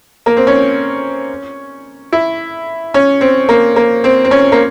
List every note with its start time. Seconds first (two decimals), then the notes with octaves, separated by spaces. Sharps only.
0.26 A#3
0.37 C4
0.47 C#4
2.12 E4
2.94 C#4
3.21 C4
3.49 A#3
3.76 A#3
4.04 C4
4.25 C4
4.31 C#4
4.52 A#3